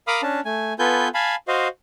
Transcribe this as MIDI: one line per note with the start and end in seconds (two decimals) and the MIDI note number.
0.07 0.21 70
0.07 0.21 77
0.07 0.21 83
0.07 0.21 86
0.07 0.21 87
0.07 0.21 89
0.22 0.41 61
0.22 0.41 62
0.22 0.41 81
0.45 0.73 57
0.45 0.73 80
0.79 1.08 59
0.79 1.08 65
0.79 1.08 69
0.79 1.08 71
0.79 1.08 80
0.79 1.08 91
1.14 1.35 77
1.14 1.35 80
1.14 1.35 81
1.14 1.35 83
1.48 1.68 66
1.48 1.68 72
1.48 1.68 75
1.48 1.68 77